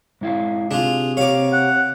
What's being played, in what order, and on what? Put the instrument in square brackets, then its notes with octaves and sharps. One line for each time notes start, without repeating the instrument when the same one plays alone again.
[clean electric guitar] G#2 E4 F5
[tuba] C3 [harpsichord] D4 F4 [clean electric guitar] G#4
[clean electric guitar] G4 C#5 [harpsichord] F5 D6
[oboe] F#5